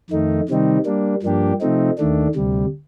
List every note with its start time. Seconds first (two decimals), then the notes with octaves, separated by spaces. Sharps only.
0.10 F2 D#3 A3 D#4
0.49 C3 D#3 G3 C4 D#4
0.85 G3 A#3 D4
1.22 G2 F3 A#3 D4 G4
1.61 C3 F3 A3 C4 D#4
1.98 D#2 D#3 A3 D4
2.35 D2 C3 G3